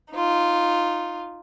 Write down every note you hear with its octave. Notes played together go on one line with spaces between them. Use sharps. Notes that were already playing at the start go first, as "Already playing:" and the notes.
D#4 F4